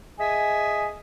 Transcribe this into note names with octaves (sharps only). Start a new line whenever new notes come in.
G#4 D#5 E5 G#5